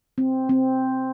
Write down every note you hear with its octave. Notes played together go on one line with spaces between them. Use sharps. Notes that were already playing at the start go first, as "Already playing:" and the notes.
C4
C4